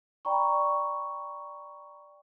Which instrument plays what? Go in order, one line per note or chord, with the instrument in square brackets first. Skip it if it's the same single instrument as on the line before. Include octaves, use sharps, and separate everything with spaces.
[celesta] D5 G5 A#5 B5 C#6